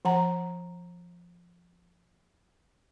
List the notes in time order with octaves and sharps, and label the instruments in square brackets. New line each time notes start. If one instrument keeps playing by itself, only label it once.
[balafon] F3 F#5 A#5